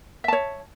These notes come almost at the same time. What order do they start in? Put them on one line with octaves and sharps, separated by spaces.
E5 A5 C#5